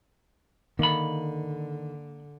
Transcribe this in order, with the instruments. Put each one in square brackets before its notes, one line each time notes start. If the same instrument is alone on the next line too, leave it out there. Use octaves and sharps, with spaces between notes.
[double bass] D3 [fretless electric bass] D#3 [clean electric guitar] A#3 B5